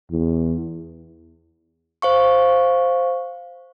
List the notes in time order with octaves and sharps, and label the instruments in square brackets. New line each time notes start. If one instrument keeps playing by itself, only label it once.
[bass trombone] E2
[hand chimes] C5 F5 C#6